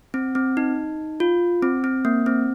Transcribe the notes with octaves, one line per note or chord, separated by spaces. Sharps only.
C4
C4
D#4
F4
C4
C4
A#3
C4